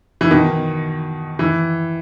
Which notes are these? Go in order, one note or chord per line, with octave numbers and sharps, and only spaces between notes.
E3
B2 D#3
E3